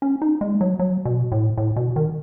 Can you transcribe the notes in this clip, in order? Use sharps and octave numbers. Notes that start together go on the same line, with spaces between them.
C#4
D#4
G#3
F#3
F#3
B2
A2
A2
B2
D#3